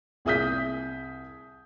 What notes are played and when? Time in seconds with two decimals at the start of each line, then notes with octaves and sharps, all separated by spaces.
0.25 C2 G#4 E5 D#6 G6 B6